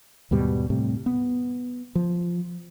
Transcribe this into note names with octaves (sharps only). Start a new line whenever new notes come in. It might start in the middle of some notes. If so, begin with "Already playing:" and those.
D#2 G#2 B2 G3
A2 C3 G3
B3
F3